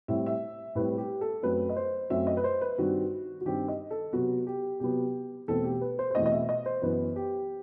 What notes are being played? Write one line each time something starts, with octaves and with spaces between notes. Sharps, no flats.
A2 G3 C4 E5
E5
A2 G3 C4 B4
G4
A4
F#2 F#3 A3 C4 B4
D#5
C5
F#2 F#3 A3 C4 E5
D#5
B4
C5
B4
G2 D#3 G3 C4 F#4
F#4
G2 D#3 G3 C4 G4
D#5
A4
C3 F#3 B3 F#4
G4
C3 F#3 B3 G4
E2 B2 A3 C4 A4
G4
B4
C5
C5
E2 B2 A3 C4 D#5
D#5
E5
D#5
C5
F#2 E3 B3 B4
G4